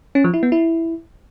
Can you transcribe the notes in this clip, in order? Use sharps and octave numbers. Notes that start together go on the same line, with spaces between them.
C#4
F3
E4
B3
E4